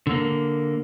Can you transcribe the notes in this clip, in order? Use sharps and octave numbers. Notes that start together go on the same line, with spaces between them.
D3 A#3